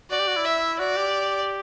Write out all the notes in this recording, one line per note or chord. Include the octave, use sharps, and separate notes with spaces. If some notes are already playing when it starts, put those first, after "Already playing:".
F#4 D5
G4
F#4
E4
E5
F#4 D5
G4